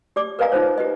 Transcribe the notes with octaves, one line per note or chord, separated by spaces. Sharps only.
G4 D5 D6
A#4 B4 D#5 F5 G#5 A#5
D#4 F4 A4 C5 C#5
G4 B4 D#5